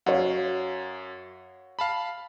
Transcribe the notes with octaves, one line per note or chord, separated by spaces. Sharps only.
F#2 F#4 C#5 F5
F5 A5 B5